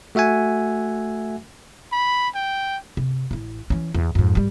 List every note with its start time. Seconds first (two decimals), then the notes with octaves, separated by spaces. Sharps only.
0.15 A3 F#4 E5 F#5 G#5
1.93 B5
2.35 G5
2.97 C3
3.31 A1 E4
3.70 E3 C#4
3.95 E2
4.15 F2 G#2
4.35 G#1 G3